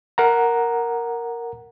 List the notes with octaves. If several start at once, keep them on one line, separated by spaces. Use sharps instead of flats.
A#4 F#5 A#5